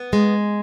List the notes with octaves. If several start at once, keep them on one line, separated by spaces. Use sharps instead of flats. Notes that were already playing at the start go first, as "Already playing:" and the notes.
Already playing: B3
G#3